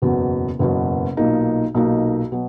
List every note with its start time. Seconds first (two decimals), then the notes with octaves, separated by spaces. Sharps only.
0.02 F#1 E2 B2 F#3
0.59 F#1 E2 B2 F#3
1.17 B1 A#2 A#3 D#4
1.75 B1 A#2 A#3 D#4
2.32 B2 F#3